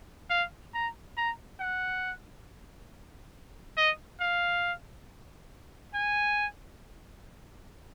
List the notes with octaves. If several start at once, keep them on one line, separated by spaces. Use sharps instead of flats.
F5
A#5
A#5
F#5
D#5
F5
G#5